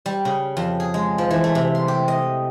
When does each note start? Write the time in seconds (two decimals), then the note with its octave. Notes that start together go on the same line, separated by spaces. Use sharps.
0.06 G3
0.25 C#3
0.57 F2
0.80 G#4
0.94 G#3
1.18 F3
1.31 E3
1.44 A3
1.55 C3
1.75 C6
1.88 G4
2.08 D#5